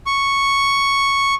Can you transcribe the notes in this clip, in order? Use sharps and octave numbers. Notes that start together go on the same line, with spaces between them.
C#6